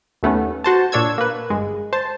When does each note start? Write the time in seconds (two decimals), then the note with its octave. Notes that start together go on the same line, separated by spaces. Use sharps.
0.23 D#2 A3 B3 C#4
0.64 F#4 C5 A5
0.92 A#2 D4 C#5 E6 G#6
1.18 A#3 B4
1.50 G1 G#3
1.93 C5 A5